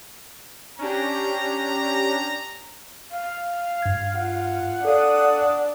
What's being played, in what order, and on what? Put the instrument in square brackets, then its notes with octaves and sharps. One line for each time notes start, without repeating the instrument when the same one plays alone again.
[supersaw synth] C#4 D4 G4 [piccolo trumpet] A#5
[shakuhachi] F5
[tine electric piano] G2 G#6
[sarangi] F4 [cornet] F#5
[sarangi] D4 [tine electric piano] A4 D5 F5 [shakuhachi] D#6